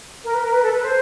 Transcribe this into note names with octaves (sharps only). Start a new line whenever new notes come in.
A#4
B4
A#4
B4
A4
B4
C5